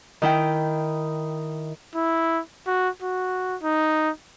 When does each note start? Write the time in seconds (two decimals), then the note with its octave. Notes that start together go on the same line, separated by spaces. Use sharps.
0.22 D#3 E4 G5
1.95 E4
2.67 F#4
3.02 F#4
3.63 D#4